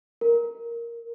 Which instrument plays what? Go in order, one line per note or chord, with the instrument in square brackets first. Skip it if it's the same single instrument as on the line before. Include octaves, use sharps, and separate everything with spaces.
[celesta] A#4